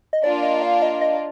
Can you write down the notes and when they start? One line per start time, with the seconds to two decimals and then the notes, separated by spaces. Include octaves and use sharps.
0.13 D#5
0.24 A#3 D4 F4 D5
0.43 D#5
0.63 F5
0.82 D#5
1.01 D#5